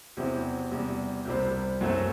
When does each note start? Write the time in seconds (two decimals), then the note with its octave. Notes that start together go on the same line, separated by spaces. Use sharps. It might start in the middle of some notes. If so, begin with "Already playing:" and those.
0.17 E2 C3 F#3 C4 E4
0.71 E2 C3 G3
1.25 C2 C3 G3 C4
1.81 F#2 F#3 A3 C4 F#4